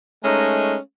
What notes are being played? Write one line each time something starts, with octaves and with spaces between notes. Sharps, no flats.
G#3 A3 C#4 D#4 A#4